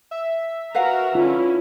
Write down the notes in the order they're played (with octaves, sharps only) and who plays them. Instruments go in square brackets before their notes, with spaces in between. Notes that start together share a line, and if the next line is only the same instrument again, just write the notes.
[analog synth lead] E5
[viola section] F#4 A#4 A#5 [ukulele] B4 F5 F#5
[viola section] D3 C#4 E4 [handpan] F4